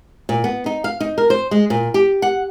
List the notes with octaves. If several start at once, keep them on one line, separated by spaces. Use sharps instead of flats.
A#2
B3
D#4
F5
D#4
A#4
C5
G#3
A#2
G4
F#5